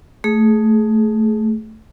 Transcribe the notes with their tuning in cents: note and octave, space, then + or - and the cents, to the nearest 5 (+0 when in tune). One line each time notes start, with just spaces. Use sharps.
A3 +0 G#4 +15